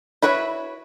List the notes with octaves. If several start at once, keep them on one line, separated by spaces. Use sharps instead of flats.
E4 F#4 B4 C#5 E5